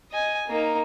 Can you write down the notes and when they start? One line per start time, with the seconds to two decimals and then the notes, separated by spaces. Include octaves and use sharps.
0.11 D#5 G#5
0.48 A#3 D#4